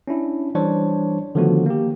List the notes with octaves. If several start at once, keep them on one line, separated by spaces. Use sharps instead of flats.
C#4 D4 E4
E3 G3 D4 C5 C#5
D3 D#3 F3 A3 B3 F#4
A#3 G4